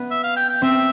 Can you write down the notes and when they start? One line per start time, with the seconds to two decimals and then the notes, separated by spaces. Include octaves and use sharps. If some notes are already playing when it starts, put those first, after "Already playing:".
Already playing: B3
0.11 E5
0.24 F5
0.36 G5
0.49 G5
0.62 C4 E5